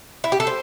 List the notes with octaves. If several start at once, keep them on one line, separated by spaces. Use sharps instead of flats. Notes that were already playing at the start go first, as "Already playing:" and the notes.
E4
G4
A4
C5